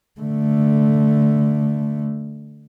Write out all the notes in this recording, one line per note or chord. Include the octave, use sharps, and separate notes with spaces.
D3 A3